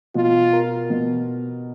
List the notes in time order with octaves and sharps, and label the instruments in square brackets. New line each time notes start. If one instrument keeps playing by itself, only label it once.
[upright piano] B2 [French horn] F4
[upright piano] A#4
B2